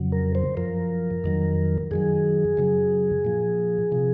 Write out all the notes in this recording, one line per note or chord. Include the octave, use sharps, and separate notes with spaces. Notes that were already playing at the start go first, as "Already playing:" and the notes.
Already playing: F2 C#3 F#3
A#4
C5
F#2 F3 A#4
F2 D#3 F#3
F#2 D#3 F#3 G#4
F#2 C#3 F#3
A#2 F3
C3 F3